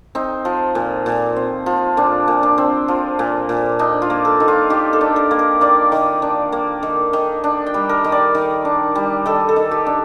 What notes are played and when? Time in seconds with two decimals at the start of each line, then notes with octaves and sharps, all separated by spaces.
0.15 C4 D#4
0.45 F3
0.75 A#2
1.06 A#2
1.36 C4
1.66 F3
1.97 A#2 D4
2.28 A#2
2.43 D4
2.58 C4
2.88 F3
3.19 A#2
3.49 A#2
3.79 D4 D#4
4.02 F4
4.10 A#3
4.25 A4
4.40 D#3
4.48 F4
4.70 D#3 G4
4.93 A4
5.01 D4
5.16 A#4
5.31 A#3
5.39 A#4
5.61 D#3 D5
5.92 D#3
6.22 D4
6.52 A#3
6.83 D#3
7.13 D#3
7.44 D4
7.67 G5
7.74 G3
7.89 A#4
8.04 D#3
8.12 D5
8.35 D#3
8.65 D4
8.95 G3
9.26 D#3 A4
9.49 A4
9.56 D#3
9.71 G4
9.86 D4